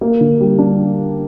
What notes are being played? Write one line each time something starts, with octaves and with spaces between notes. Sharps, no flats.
A#3
D3
G3
D4